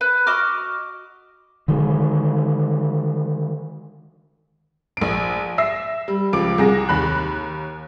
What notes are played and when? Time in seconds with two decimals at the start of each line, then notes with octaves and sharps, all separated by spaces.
0.01 B4
0.27 F#4 D#5 D6 F6
1.68 D3 D#3 F#3 G#3
4.97 A#1 D7
5.58 E5 E6 A#6 C7
6.08 G3
6.33 C#2 F3 D6 D7
6.58 C2 G#4 A#6
6.89 D#2 B5 F#6